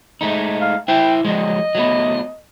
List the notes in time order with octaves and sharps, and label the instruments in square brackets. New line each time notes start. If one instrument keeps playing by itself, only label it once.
[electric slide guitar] G#3 A3 D#4
[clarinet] F5
[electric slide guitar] E4 C5 E5 [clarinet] G5
[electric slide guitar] F3 F#3 G#3 [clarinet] D#5
[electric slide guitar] F#3 A3 B3